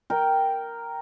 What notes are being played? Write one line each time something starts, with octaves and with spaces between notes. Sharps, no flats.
A#4 G5